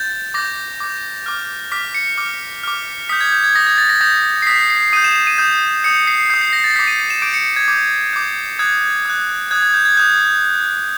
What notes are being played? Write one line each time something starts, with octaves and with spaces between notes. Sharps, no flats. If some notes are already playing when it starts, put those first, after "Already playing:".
Already playing: G6 A6
D6 G6 A#6
D6 G6
D6 F6
D6 F6 B6
C#7
D6 F6
D6 F6
D#6 G6 B6
G#6
G6
G#6
D#6 G6 A#6
G#6
A6
A#6
D#6 G6 A#6
C7
D#6 G6 B6
C7
D#6 G6 D#7
E7
E7
D#7
D#6 G6
D#6 G6 C#7
C7
D#6 G6 C7
C7
A#6
A6
A#6
D6 G6 B6
D#7
D#7
E7
D6 G6 D7
C#7
G#6
D6 G6
D6 G6
D#6 F#6 G#6
D#6 F#6
D#6 F#6 G#6
G#6
G6
G#6
D#6 F#6 G6